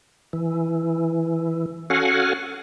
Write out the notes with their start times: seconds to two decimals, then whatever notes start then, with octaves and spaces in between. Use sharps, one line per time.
0.33 E3
1.90 C#4 F#4 A4 F5 F#5 G#5